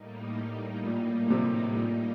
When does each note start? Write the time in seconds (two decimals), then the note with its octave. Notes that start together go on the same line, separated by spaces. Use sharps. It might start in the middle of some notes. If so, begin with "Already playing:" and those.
Already playing: A2 G3 A#3 D#4
0.85 A#2
1.27 A#2
1.30 C3
1.77 A#2